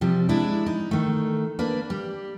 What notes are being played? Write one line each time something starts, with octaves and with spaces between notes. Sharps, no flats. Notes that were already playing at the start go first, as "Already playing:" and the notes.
C3 F3 G3
G#3 D4 E4
D#4
D#3 A3
A#3 D4 B4
G3